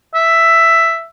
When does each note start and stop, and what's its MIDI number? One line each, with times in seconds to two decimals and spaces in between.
0.14 1.07 76